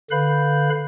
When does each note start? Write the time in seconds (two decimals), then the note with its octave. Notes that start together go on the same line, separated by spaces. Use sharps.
0.11 D3 B4 F5 B5 G6